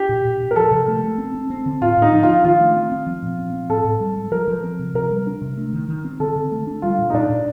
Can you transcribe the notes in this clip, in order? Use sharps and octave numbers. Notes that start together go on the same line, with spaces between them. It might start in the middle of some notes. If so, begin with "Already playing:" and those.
Already playing: D4 G4
A#2
A#2
A#2
A#4
F3 A4
C3
A3
A3
C4
C4
C4
D3
A2 F4
A2 D#4
F3
F4
D4
D#3 F4
A3
C4
C4
F3
A#2
C4
C4
A2 A4
A2
G3
G3
F3 A#4
F3
C4
C3
C3 A#4
G3
D4
C3
A3
D#3
D#3
C4
D3 A4
D3
A3
D4
G3 F4
A#2
D#4
A#2 D4
A#2